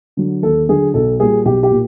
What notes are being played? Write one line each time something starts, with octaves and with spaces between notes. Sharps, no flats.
D3 F#3
D#2 A4
D3 F#3 G#4
B1 A4
A#2 G3 G#4
B1 G4
G4
A#2